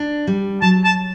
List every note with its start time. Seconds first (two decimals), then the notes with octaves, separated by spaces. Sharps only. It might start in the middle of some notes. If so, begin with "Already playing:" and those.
Already playing: D4
0.27 G3
0.62 F#3 A5
0.84 A5